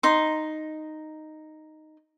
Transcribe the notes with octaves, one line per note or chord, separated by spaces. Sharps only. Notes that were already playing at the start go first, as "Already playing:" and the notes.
D#4 C6